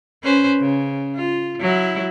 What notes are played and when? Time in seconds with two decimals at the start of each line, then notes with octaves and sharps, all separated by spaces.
0.24 C#4 B4 C5
0.60 C#3
1.16 F4
1.60 F#3 E4